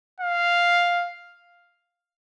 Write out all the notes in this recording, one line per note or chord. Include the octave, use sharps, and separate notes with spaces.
F5